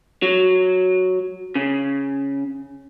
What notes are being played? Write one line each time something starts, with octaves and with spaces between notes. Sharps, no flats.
F#3
C#3